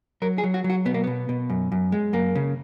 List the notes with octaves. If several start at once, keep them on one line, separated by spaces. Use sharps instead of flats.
F#3 A#4
G#4
F#3
F#4
F#3
F#4
B2 B3
A#3
B2 B3
B2
F#2
F#2
G#3
F#2 A#3
C#3